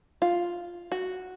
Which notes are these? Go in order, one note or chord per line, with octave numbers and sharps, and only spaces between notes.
F4
F#4